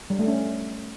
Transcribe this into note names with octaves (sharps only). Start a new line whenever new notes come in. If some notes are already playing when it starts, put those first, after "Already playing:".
G3
A3
C#4